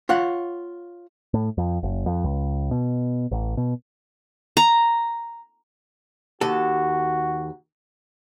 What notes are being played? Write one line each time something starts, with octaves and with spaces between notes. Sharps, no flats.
F4 C#5 F#5
A2
F2
F#1
F2
C#2
B2
A1
B2
A#5
D#2 F#4 A4